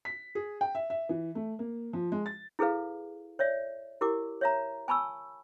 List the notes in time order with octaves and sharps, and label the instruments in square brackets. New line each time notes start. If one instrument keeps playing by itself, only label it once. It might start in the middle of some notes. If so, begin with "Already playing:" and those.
[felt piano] B6
G#4
G5
E5
E5
E3
A3
A#3
F3
G#3
A6
[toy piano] E4 G#4 A4 B4 F5
C#5 D5 E5
E4 G4 A#4 D6
C#5 E5 A#5
G#5 A5 B5 C#6 E6